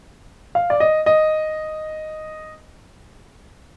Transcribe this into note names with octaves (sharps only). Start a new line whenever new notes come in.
F5
D5
D#5
D#5